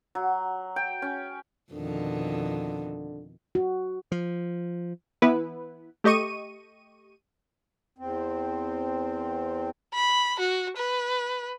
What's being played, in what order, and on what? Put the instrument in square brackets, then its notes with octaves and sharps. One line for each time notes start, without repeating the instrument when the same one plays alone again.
[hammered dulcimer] F#3
G5
C#4
[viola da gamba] F2 B2 D#3 [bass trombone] D3
[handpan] F#4
[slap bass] F3
[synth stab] E3 B3 E4 B4
A3 G4 D#5 C#6 D#7
[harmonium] E2 C4
[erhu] B5
F#4
B4